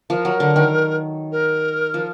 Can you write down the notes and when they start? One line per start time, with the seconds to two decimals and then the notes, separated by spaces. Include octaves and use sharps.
0.10 F3 A#4
0.25 F#3
0.40 D3
0.56 D#3
1.32 A#4
1.94 F3